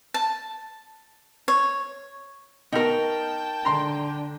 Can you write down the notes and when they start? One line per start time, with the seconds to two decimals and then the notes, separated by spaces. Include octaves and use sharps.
0.14 A5
1.48 C#5
2.73 B2 D#4 A#4 G5 A5
3.65 D3 A#5 C6